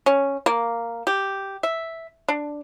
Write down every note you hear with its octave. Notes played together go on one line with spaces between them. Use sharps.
C#4
A#3
G4
E5
D4